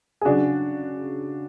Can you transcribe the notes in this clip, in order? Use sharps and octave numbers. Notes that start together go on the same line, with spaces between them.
G#4
C#3 F#3 D4 F#4